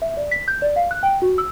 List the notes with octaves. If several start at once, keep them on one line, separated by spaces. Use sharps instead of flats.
E5
D5
B6
G6
D5
F5
F#6
G5
F#4
E6